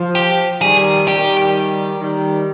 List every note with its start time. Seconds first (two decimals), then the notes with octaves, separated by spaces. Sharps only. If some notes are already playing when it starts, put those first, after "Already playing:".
Already playing: F3
0.15 G4
0.61 D#3 G3 G#4
1.08 D#3 G3 G4
2.00 D#3 G3